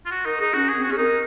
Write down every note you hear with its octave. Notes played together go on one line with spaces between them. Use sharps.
F4
F#4
D#4 A#4
D#4 G#4
C#4 F#4
G#4
C4
F#4
C#4 G#4
D#4 A#4